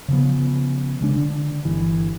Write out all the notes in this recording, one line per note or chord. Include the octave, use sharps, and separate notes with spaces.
C#3 F3 B3
C#3 G#3 D4
D3
G1 E3